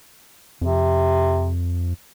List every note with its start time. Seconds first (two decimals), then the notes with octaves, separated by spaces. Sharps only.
0.62 F2 C3